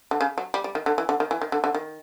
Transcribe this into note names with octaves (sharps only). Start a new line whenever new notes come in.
D3
C#3
F#3
G3
G3
D#3
D3
E3
D3
D#3
E3
D#3
D3
D3
D#3